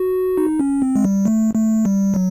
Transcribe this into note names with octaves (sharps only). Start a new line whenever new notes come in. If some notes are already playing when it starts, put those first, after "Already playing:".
Already playing: F#4
D#4
C#4
C4
G#3
G3
A3
A3
G3
F#3